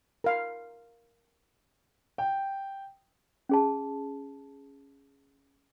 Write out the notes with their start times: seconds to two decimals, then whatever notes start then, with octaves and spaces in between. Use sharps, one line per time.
0.24 A#4 F5
2.18 G5
3.49 C#4 G#4 A5